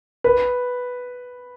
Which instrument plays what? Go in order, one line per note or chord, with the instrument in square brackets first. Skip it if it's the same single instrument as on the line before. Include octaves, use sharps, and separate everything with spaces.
[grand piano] B4